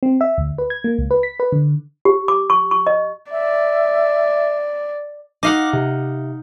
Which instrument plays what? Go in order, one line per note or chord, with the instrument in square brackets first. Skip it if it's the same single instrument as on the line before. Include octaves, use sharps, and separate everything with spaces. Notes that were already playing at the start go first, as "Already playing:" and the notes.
[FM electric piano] C4
E5
D2
B4
G#6
A#3
C#2
B4
B6
B4
D3
[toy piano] G4
D6
C#6
C#6
D#5
[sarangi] D5 [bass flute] E5
[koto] D#4 F5 F#5 [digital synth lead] D6
[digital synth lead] C3